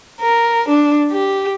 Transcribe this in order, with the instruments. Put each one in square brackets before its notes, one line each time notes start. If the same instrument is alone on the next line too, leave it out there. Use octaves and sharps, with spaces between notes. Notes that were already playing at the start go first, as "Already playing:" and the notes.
[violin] A#4
D4
G4